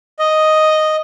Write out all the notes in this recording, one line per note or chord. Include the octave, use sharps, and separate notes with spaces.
D#5